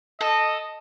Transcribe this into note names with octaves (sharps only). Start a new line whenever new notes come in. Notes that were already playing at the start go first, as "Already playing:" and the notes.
A4 D#5